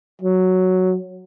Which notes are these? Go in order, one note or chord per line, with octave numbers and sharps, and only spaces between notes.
F#3